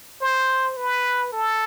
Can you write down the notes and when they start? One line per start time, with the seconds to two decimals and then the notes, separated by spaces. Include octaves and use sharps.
0.22 C5
0.77 B4
1.32 A4